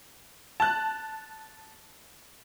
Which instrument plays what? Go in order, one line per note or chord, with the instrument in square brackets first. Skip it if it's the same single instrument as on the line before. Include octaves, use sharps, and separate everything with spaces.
[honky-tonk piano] A5 F#6